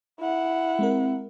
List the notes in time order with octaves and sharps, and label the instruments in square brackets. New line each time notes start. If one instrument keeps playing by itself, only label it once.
[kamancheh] E4 F#5
[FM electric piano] G#3 C4 A#4